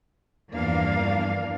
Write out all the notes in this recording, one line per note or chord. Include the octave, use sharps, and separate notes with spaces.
E2 G2 F3 A#3 D4 F5